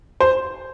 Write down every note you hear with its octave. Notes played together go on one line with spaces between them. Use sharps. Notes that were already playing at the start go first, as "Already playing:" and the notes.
C5